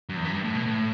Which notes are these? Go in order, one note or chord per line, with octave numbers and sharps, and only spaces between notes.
F#2
E2
F#2
G2
A2
B2
A2